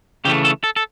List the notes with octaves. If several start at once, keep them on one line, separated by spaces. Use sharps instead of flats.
C#3 E3 A3 G4
A4
A4
A4